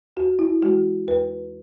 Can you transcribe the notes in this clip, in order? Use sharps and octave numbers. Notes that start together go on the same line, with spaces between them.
E2 F#4
E4
E3 G#3 F#4
E2 B4